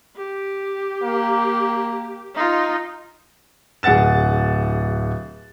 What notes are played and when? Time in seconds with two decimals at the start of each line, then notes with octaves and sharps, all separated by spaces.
0.17 G4
1.03 A#3
2.35 D#4 F4
3.83 D1 G#4 F#5 A6 E7